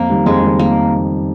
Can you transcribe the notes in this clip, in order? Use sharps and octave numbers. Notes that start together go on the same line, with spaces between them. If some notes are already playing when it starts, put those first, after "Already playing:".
Already playing: F2 A#3
D#3 G3
F2 G#3
D#3 G3
A#3